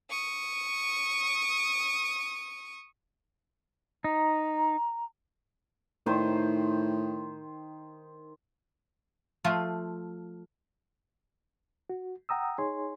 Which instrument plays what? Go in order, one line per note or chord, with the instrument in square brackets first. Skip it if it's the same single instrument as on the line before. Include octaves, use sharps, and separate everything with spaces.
[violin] C#6 D#6
[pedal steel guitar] D#4 [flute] A#5
[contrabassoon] A2 [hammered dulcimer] D#3 C5
[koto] F3 A3 F4
[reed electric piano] F#4
F#5 G5 A#5 D#6 E6
D#4 G#4 C#5 G#5 C6